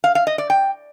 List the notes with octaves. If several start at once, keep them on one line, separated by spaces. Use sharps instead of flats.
F5
F5
D#5
D5
G5